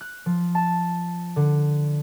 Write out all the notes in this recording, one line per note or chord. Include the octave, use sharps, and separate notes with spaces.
F#6
F3
A5
D3